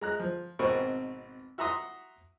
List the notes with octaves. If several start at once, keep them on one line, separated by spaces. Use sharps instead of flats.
G#3 A#5 F#6
F3
G#1 B2 C4 A#4 B4 C#6
F#4 E5 F#5 A#5 C6 D#6